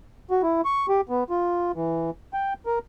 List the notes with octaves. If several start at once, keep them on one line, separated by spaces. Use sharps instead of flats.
F#4
E4
C#6
G4
B3
F4
E3
G5
A#4